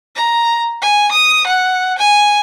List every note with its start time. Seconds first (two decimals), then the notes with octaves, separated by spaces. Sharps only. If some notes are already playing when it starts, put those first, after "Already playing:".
0.16 A#5
0.81 G#5
1.12 D#6
1.46 F#5
1.98 G#5